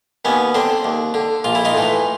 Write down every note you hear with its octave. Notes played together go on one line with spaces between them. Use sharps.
D#2 B3 C#4
D3 C4 D4
D#2
D3
A#1 F4
E4
D#4 F4
A2 E3